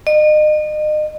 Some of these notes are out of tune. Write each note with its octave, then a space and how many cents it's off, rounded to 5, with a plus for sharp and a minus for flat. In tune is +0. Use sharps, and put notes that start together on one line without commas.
D#5 -35